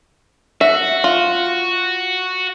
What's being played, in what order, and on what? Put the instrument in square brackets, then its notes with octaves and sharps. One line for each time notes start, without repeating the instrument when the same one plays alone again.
[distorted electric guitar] F#4 [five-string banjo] E5
[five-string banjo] F4